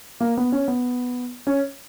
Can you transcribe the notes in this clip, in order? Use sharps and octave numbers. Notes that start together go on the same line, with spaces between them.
A#3
B3
C#4
B3
C#4